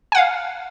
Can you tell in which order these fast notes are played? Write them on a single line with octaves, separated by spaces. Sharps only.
G#5 F#5 F5